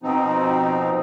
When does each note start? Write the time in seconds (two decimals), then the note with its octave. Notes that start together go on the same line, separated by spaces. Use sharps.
0.03 B2 F3 C4 D#4